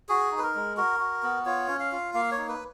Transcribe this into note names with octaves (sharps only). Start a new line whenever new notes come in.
F#4 G#4
D#4
B4
A#4
G#3
F#4 A#4
F#4
B3
F4 C#5
C#4
F5
F4
A#3 F5
C#5
D#4
B4